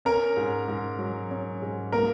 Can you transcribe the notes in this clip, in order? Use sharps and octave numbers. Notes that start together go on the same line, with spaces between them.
C#4 A#4 A#5
G#2
G#2
F#3
C#4
G#2
A#3 A#4 A#5